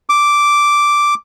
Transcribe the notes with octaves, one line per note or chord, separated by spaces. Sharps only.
D6